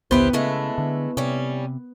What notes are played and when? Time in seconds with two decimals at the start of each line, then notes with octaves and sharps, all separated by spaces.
0.11 A#1 D#2 D3 B3 E4 G4 B4 C5
0.33 C#3 G#3 A3 E4
0.78 D3
1.17 C3 G3 C#4